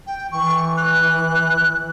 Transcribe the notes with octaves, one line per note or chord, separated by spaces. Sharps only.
G5
E3 C#6
F#6